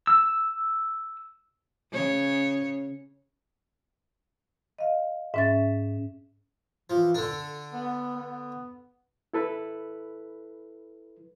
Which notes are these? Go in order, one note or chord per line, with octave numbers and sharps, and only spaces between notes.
E6
C#3 C#5
D#5 F5
G#2 C#4 E5 A6
E3 F3
D3 D4 A4
B3
B3
E4 A4 B4